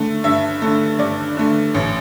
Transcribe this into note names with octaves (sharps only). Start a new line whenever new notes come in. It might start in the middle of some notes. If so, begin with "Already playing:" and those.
Already playing: D3 A3
G2 E5
D3 A3
G2 D5
D3 A3
A1